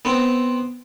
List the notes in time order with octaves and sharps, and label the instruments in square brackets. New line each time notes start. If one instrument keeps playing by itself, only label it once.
[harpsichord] B3 C4